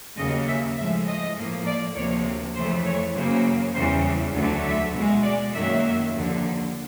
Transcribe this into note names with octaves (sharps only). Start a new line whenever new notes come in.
D#2 C#3 F#3 A#3 D#5
E5
A2 F3 G#3 E5
D#5
A2 F3 A#3
D5
D2 C3 F3 A#3 C#5
F2 C#3 E3 A3 C5
C#5
F#2 C#3 F#3 A#3 C5
E2 C#3 E3 G3 C5
D2 D3 F#3 A3
E5
B2 G#3
D5
F#2 D#3 F#3 A#3 E5
D#2 D3 F3